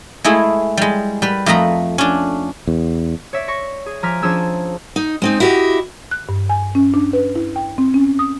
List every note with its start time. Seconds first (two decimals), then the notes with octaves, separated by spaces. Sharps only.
0.24 G#3 A3 E4 G#4
0.77 G3 G#3
1.22 G3 B4
1.46 F2 A3 D#5 A#5 B5
1.98 C#4 D4
2.68 E2
3.33 C#5 D5 E5
3.48 C#6 A#6 C#7
3.86 G#4
4.03 F3 G#5 A#5 D6 F6 B6
4.22 F3 C#4 D4 G#4 E6 G#6
4.96 D#4
5.22 G#3 C4 D#4
5.40 E4 F#4 G4 B4 D#5
6.11 F#6
6.29 G2
6.49 G#5
6.75 C#4
6.94 D4
7.13 B4
7.36 E4
7.56 G5
7.78 C4
7.94 C#4
8.19 D#6